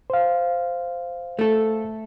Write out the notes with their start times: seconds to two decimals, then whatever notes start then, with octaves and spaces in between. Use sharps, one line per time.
0.10 C5 F5
1.39 A3 A4